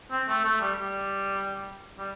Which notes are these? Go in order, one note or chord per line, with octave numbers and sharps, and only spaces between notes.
C4
A3
A3
G3
G3
G3